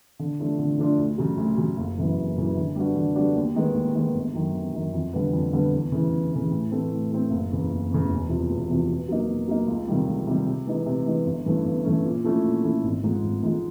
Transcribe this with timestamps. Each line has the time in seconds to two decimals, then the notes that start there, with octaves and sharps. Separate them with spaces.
0.19 D3
0.39 F3 A3 D4 F4
0.59 D3
0.78 F3 A3 D4 F4
0.99 D2
1.18 C#3 F#3
1.38 D2
1.58 C#3 F#3
1.77 F#1
1.98 F#2 C#3 E3
2.17 F#1
2.37 F#2 C#3 E3
2.57 D3
2.76 G3 B3 D4 F#4
2.96 D3
3.15 G3 B3 D4 F#4
3.35 D#2
3.56 D#3 G#3 B3
3.75 D#2
3.95 D#3 G#3 B3
4.14 G1
4.34 F#2 D#3
4.54 G1
4.74 F#2 D#3
4.93 F2
5.13 D3 G3 B3
5.33 F2
5.53 D3 G3 B3
5.73 E2
5.92 C#3 E3
6.12 E2
6.32 C#3 E3
6.51 A2
6.71 E3 A3 C4
6.91 A2
7.11 E3 A3 C4
7.30 F#1
7.50 E2 C#3
7.71 F#1
7.90 E2 C#3
8.09 E1
8.29 E2 C3 F3
8.49 E1
8.69 E2 C3 F3
8.89 B2
9.08 F#3 A#3 D#4
9.28 B2
9.48 F#3 A#3 D#4
9.68 C#2
9.88 C3 D#3 G3
10.07 C#2
10.27 C3 D#3 G3
10.46 C3
10.66 E3 G#3 B3 D#4
10.86 C3
11.06 E3 G#3 B3 D#4
11.26 G1
11.46 G2 E3 A3 C#4
11.65 G1
11.85 G2 E3 A3 C#4
12.04 A#2
12.24 F3 A3 C#4 E4
12.44 A#2
12.64 F3 A3 C#4 E4
12.84 G#1
13.03 G#2 F3 G#3
13.23 G#1
13.43 G#2 F3 G#3